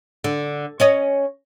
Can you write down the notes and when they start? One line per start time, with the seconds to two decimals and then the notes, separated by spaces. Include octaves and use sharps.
0.24 D3
0.80 C#4 C#5 D#5